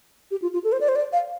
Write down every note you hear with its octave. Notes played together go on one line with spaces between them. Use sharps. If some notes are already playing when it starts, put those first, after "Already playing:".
G4
F4
F4
A4
C5
D5
C5
D5
F5